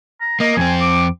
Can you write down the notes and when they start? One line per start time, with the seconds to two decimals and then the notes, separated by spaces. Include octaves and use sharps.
0.20 A#5
0.40 A#3 D#5
0.57 F2 C4 G#5
0.80 D6